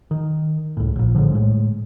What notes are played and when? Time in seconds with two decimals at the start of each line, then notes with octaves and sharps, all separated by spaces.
0.11 D#3
0.77 C#2 A2
0.96 A#1 A#2
1.15 A#1 A2 D3 F3
1.32 A2 G#3